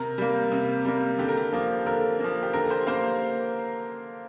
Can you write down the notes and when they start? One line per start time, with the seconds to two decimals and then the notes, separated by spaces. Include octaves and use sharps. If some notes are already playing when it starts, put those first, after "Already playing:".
Already playing: C3 A#4
0.18 G3 A#3
0.52 C3
0.85 G3 A#3
1.19 D3 G4
1.29 A#4
1.37 G4
1.53 F3 A#3
1.86 D3 A#4
2.20 F3 A#3
2.43 G4
2.53 D3 A#4
2.70 G4 C5
2.87 A#3 C5 F5